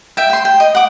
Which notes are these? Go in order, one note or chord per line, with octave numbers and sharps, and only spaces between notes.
E5 G5
G5 C6
G5
D#5
F#5 D6